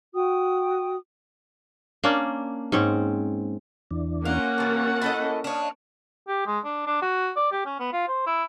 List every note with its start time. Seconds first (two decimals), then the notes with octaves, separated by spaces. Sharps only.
0.13 F#4 G5 D#6
2.04 A#3 C#4 D4
2.72 G#2 C4 C#4
3.91 E2 E3 D4
4.25 A#3 C#4 F4 F#4 F#5
4.58 C3 E3 A5
5.02 E4 A4 D#5
5.44 D4 C#5 D#5 F5
6.28 G4
6.47 G#3
6.64 D4
6.87 D4
7.02 F#4
7.36 D5
7.52 G4
7.66 C#4
7.80 B3
7.93 F4
8.08 C5
8.26 E4